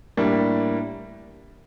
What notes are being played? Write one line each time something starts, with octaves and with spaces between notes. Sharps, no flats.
A2 G3 A#3 D4